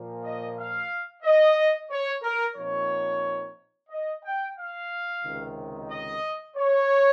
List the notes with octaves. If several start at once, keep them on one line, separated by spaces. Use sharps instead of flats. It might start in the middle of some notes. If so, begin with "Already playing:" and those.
Already playing: A#2 F3 A#3
D#5
F5
D#5
C#5
A#4
A#2 F3 C4 D#4 C#5
D#5
G5
F5
C#2 C3 D#3
D#5
C#5